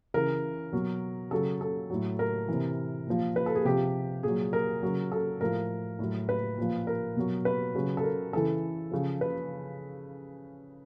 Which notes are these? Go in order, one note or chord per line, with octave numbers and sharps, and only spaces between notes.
C#3 E3 A#4
B2 F#3
C#3 F#3 A4
A4
A2 F#3
A#4
C3 E3
A#2 F3
B4
A4
G#4
C3 F3 G4
A#2 F#3 G#4
A#4
C#3 F#3
A4
A2 F3 A#4
A2 F#3
B4
A#2 F3
A#4
B2 F#3
B4
C#3 F#3
A4
A#4
C#3 E3 A4
C#3 F3
B4